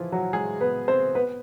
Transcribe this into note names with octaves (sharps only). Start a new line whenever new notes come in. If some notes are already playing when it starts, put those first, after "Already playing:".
Already playing: E3 F3 E4 F4
F#3 F#4
G#3 G#4
B3 B4
C4 C5
B3 B4